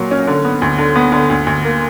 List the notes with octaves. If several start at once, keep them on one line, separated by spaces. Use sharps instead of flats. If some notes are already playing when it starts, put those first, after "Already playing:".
Already playing: A#2 F#3 A#3
C#4
D3
B3
D2
D3
B3
D3
D2
D2
A#3